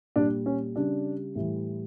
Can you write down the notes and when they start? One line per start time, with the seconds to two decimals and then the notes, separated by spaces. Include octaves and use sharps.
0.16 A#2 G3 D4
0.46 C#4
0.76 C#3 G3 D4
1.35 A2 E3 G3